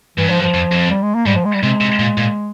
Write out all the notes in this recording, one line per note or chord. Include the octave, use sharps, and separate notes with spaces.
G2 E3
G#2 F3
G2
F3
F2
F2
G3
G#3
A#3
G#2 G3
F3
G#3
G3
C3 G#3
C3
A#2
A#2